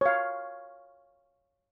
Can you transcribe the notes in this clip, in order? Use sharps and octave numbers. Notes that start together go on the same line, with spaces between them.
C#5 F5